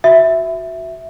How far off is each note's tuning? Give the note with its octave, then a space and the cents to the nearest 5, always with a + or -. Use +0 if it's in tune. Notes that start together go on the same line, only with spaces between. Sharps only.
F#4 +0 E5 +0